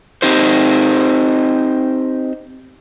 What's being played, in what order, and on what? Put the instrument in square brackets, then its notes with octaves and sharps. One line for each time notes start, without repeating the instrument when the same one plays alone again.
[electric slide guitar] C4 D#4 G4 C5